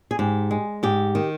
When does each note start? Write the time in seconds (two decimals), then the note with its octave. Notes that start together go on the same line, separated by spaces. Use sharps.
0.11 G#4
0.19 G#2 G4
0.51 G#3
0.83 G#2 G4
1.15 D#3